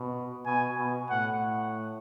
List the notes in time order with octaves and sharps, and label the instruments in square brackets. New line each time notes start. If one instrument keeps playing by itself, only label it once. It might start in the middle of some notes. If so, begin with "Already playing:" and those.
Already playing: [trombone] B2
[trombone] B2 [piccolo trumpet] G#5
[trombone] B2
[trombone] A2 [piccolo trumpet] F#5